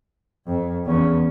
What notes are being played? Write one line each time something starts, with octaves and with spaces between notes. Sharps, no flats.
F2
E2 C#4